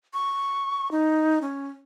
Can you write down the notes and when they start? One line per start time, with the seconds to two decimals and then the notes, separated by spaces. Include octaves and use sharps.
0.14 C#6
0.91 D#4
1.42 C#4